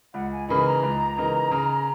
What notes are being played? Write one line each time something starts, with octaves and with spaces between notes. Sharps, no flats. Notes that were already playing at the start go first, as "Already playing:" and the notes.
C#2 F#5
G#5
C#3 E3 A#3 D#4 B5
A#5
C#2
C#3 E3 A#3 D#4
C#3